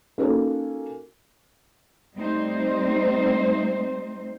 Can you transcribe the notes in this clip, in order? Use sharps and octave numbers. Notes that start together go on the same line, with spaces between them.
A#3 C#4 D#4 F#4 A4 A#4
G3 A3 C4 D#4 C5